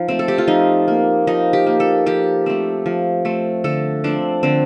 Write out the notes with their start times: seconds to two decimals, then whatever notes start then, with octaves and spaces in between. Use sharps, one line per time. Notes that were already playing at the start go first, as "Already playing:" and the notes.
Already playing: F3 D#4
0.08 A3 C4
0.19 A4
0.28 G4
0.38 F4
0.47 F3 D#4
0.88 A#3
1.27 F3 D#4
1.53 G4
1.66 A#3
1.80 A4
2.06 F3 G4
2.46 A3 C4
2.86 F3
3.25 A3 C4
3.64 D3 A4
4.04 F3 C4 D4
4.43 D3 C4